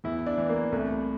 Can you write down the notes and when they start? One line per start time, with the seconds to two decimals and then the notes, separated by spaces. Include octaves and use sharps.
0.04 E2 E4
0.26 D4
0.38 E3
0.49 A#3
0.72 C2 A3